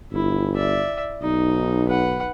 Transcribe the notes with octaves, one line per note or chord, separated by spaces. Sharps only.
G1 E4
D5 E5
B1 D#4
B4 F#5